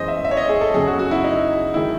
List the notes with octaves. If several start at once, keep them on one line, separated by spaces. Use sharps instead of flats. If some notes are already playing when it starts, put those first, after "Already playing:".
Already playing: F#2 E3 G#3 C5 D#5
E5
E5
C#5
D#5
G#4
A4
F#2 C#3 F#3 G#4
F#4
F#4
E4
D#4
D#3 G#3 E4